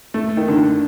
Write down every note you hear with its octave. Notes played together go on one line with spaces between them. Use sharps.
A3
D#3
D3